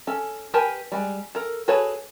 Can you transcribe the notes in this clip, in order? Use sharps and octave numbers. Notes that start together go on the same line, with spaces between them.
C#4 A4
G4 A#4 B4 G#5 A5
G3 G#3
A4 A#4
F#4 G#4 A4 B4 C#5